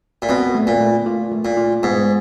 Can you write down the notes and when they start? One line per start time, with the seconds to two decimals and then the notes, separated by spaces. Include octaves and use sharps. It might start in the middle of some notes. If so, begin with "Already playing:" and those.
0.22 A#2
0.29 B2 C4
0.55 A3
0.67 A#2
0.81 A3
1.06 F4
1.31 A3
1.45 A#2
1.57 F4
1.83 G#2 B3